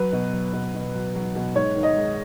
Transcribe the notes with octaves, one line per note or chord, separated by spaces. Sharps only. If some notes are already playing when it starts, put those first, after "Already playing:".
Already playing: F#3 B4
B2
F#3
B2
B2
F#3
F#3
B2
G#2 C#5
D#3
D#5
G#3